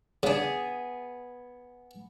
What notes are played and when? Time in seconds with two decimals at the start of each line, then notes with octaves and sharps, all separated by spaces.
0.23 C#3 B3 D4 G#4